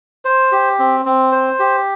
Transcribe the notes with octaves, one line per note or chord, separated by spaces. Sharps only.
C5
G4
C4
C4
C5
G4